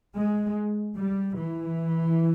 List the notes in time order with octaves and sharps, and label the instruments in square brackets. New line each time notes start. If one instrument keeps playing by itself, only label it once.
[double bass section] G#3
G3
E3